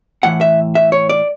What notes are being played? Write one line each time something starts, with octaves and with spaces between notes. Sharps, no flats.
A2 E3 F#5
E5
E5
C#5
D5